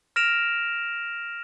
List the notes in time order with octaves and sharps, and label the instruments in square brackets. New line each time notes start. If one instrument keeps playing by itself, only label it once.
[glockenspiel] F6 A#6 D7 E7 F7